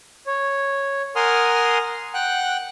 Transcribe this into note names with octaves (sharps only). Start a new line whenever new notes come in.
C#5
A#4 F#5 G#5 C6 D#6 F6
F#5 G5 F#6